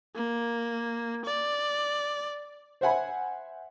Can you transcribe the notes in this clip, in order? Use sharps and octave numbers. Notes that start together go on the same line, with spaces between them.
A#3
D5
C5 E5 F#5 G#5 B5